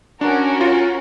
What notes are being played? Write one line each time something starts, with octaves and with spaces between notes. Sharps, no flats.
C#4 D4 F#4 A#4
F4